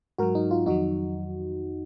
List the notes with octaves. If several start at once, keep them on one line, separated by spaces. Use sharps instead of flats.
G#2 F#3 F#4 A#4
D#4
F4
F2 D#3 F#3 D#4 F#4